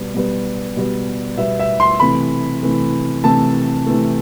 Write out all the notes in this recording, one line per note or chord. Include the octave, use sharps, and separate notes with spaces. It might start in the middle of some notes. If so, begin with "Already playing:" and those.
Already playing: B2 G3 B3
B2 G3 B3
B2 G3 B3
B2 G3 B3 E5
E5
C6
C3 E3 A3 B5
C3 E3 A3
C3 E3 A3 A5
C3 E3 A3